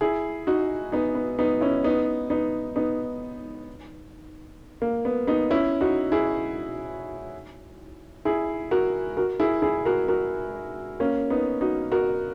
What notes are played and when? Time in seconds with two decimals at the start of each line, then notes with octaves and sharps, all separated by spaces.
0.01 E4 G#4
0.47 D#4 F#4
0.92 B3 D#4
1.15 B3
1.39 B3 D#4
1.61 C#4 E4
1.84 B3 D#4
2.30 B3 D#4
2.76 B3 D#4
4.82 A#3
5.05 B3
5.27 B3 D#4
5.50 C#4 E4
5.81 D#4 F#4
6.12 E4 G#4
8.25 E4 G#4
8.71 F#4 A#4
9.17 F#4 A#4
9.40 E4 G#4
9.62 E4 G#4
9.85 F#4 A#4
10.08 F#4 A#4
11.00 A#3 C#4
11.30 B3 D#4
11.61 D#4 F#4
11.92 F#4 A#4